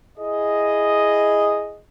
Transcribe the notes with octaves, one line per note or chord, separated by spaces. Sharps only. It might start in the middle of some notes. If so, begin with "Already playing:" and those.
E4 G#4 D#5